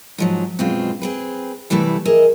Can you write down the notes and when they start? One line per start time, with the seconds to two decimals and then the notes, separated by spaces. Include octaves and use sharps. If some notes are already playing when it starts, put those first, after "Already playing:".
0.18 G#2 F3 F#3
0.59 F#2 B2 G#3 C4 F4
1.02 C4 G#4 B4
1.70 C3 E3 G3 A3 A4 B4
2.05 G#4 A#4 D#5 E5